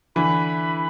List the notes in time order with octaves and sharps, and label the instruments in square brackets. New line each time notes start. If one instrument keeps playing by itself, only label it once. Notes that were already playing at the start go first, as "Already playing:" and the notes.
[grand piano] D3 E3 [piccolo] B5